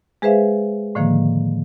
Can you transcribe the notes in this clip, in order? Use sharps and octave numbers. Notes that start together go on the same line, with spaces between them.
G#3 G#4 B4 C5 E5 F5
A2 D3 D#3 F3 A#3